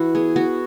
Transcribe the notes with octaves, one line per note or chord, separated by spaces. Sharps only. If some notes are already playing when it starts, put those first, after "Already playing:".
Already playing: E3 E4 F#4
B3 G#4
B3 F#4